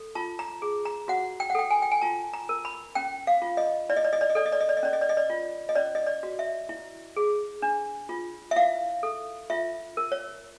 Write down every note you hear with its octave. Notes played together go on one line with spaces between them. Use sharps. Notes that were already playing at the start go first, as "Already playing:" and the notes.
Already playing: A4
F4 A5
A#5
G#4
A#5
F#4 F#5
G5
F#5
A4 G5
G#5
G5
G#5
F4 A5
A#5
A#4
B5
C#4 G5
F5
F4
D#5
E4 D5
D#5
D5
D#5
D5
D#5
A4 D5
D#5
D5
D#5
D5
D#5
C#4 D5
D#5
D5
D#5
D5
F4
D#5
C#4 D5
D#5
D5
F#4
E5
E4
G#4
D4
F4
E5
E4 F5
A4
F4 E5
A#4
C#5